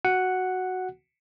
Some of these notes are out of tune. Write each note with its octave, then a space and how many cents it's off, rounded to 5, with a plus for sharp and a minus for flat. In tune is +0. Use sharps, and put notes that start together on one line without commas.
F#4 +0 F#5 +0